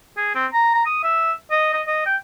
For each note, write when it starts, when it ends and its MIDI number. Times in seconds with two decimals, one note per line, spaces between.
0.17 0.31 68
0.35 0.46 60
0.53 0.70 82
0.74 0.82 82
0.86 1.03 87
1.03 1.32 76
1.51 1.72 75
1.73 1.82 75
1.87 2.04 75
2.06 2.16 79